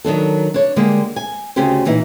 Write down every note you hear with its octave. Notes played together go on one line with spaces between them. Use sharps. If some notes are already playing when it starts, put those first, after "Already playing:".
D#3 F#3 D4 A4
D4 C#5
D3 G3 G#3 A#3
G#5
D2 C#3 C#4 G4 C5
A#2 E3 D#4